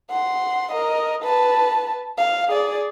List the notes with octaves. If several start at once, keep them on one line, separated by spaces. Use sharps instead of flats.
F#5 C6
A#4 D#5
B4 A5
F5
G#4 D5